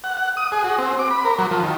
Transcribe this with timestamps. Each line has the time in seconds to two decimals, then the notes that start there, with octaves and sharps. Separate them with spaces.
0.04 F#5
0.17 F#5
0.37 D#6
0.52 G#4
0.64 F#4
0.78 C4
0.99 D6
1.11 B5
1.25 A#4
1.39 F#3
1.51 F3
1.63 D#3